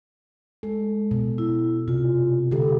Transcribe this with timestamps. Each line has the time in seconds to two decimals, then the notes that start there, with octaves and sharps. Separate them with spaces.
0.63 G#3 A4
1.11 B2
1.38 E4
1.88 C3 F4
2.51 D3 G#3 G4 A4